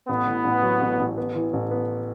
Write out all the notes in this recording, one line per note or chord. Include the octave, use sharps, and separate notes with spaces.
A1 B3
A2
A1
F#3
A1
A1
B3
E3
A1
B3